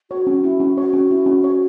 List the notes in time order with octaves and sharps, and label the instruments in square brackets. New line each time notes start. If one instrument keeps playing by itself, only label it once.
[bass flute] F#4 [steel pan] C#5
[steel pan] C#4
E4
C#4
[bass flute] F#4 [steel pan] C#5
[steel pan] C#4
E4
C#4
C#5